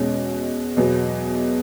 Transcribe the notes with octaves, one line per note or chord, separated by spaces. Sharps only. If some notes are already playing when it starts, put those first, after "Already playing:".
Already playing: E2 B2 G#3 C#4
E2 B2 F#3 B3